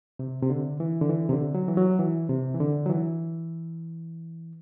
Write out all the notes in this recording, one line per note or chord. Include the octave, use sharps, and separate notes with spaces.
C3
C3
D3
E3
D3
E3
C3
D3
F#3
E3
F#3
E3
C3
E3
D3
F#3
E3